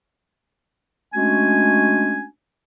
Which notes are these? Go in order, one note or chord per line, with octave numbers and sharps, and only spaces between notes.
G#3 A3 C#4 D4 F#4 G#5